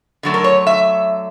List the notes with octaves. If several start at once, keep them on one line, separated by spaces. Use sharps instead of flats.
D3 F#3 A3
A#4
C#5
E5